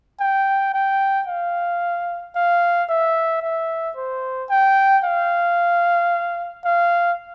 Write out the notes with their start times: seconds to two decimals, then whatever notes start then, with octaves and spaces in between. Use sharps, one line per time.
0.20 G5
0.74 G5
1.27 F5
2.36 F5
2.89 E5
3.43 E5
3.97 C5
4.50 G5
5.04 F5
6.65 F5